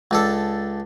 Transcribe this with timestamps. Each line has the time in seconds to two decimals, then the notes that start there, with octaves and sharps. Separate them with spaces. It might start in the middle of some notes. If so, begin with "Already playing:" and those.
0.11 C#2 D4 A4